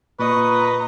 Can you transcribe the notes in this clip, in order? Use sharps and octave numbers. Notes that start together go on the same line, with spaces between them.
A#2 B4 D#5 A#5 C#6